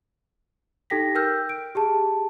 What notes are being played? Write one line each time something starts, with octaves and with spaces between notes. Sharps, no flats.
D#4 G4 A4 G5 A#6 B6
A#4 G5 E6 F6 G6
D7
G4 G#4 A5